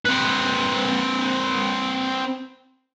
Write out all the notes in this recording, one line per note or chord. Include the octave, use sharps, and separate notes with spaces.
C4 B4